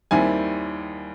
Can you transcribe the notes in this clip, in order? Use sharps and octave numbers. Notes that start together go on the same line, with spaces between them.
D#2 D#3 G3 C4 E4 G#5